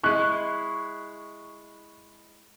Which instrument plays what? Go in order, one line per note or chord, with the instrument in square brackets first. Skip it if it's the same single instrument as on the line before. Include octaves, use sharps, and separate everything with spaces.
[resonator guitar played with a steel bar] G#3 E4 [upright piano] C#6 F#6